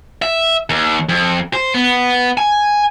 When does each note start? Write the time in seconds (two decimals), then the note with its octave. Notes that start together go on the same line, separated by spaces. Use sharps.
0.22 E5
0.70 D#2
1.09 F2
1.53 C5
1.74 B3
2.37 G#5